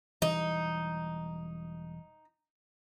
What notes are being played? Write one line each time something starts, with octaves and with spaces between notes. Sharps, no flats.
E1 E3 G3 D#4